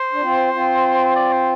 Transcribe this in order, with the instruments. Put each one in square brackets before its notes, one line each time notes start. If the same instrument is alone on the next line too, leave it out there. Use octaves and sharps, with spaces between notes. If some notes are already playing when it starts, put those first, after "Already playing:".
Already playing: [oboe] C5
[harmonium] D4
C4 F4
C4 F4
[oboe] D5
C5